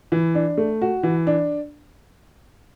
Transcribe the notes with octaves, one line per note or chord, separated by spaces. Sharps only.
E3
D4
A3
F#4
E3
D4